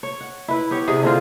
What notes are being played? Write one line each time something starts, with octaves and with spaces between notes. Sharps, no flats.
C#5
F#5
E4 B4
B3 G4 C#5
C3 G#4 D5
D3 C4 F4